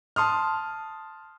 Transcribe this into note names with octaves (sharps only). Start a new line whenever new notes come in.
A5 C6 D#6 F6